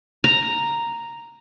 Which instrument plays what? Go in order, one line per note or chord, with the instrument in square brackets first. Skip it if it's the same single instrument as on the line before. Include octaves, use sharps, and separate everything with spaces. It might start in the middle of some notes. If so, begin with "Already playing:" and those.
[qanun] A#5